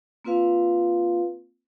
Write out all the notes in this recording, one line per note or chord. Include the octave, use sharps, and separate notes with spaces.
A#3 C4 F4 B4 F5